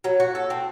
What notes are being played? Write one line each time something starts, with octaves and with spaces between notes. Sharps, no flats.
F#3
F#4
A4
C4